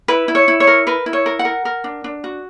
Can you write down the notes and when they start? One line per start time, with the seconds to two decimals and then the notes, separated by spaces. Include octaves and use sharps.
0.08 E4 B4
0.28 E4
0.35 C#5
0.48 E4
0.60 C#5
0.67 A#4
0.87 A#4 B4
1.06 E4
1.13 C#5
1.26 A#4
1.39 F#5
1.45 A#4
1.65 A#4
1.84 D4
2.04 D4
2.24 F#4